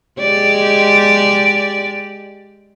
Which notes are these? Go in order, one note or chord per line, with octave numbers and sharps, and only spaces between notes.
G#3 G4 D5